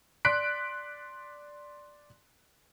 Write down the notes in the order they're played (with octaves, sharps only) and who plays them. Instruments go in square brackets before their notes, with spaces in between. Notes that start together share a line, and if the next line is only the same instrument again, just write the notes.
[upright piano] D5 C6 F#6 B6 D7